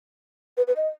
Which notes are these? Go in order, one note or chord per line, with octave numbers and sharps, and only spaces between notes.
B4
B4
D#5